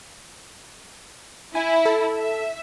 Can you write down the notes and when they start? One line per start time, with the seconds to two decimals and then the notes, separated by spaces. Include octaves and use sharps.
1.55 E4 G#5
1.86 A4
2.19 E5